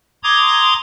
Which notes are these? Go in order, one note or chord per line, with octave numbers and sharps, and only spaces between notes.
A#5 C6 D6 D#6 G#6